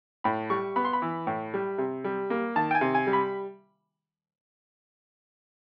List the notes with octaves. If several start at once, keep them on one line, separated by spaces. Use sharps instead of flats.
A2 B5
G3 C#6
B3 B5
C6
B5
E3
A2
G3
C3
G3
A#3
D#3 A5
G5
G#5
C3
G#5
G3
B5